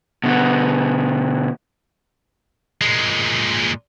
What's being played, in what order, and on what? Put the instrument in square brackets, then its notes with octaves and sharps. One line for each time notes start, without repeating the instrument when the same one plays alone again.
[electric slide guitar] B2 D3 B3
[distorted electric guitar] A#2 G#3